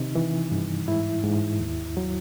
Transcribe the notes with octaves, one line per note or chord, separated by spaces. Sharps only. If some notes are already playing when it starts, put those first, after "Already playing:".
Already playing: C3 D#3 D#4
E3
G2
G#2 E4
G#2
D#2
F#3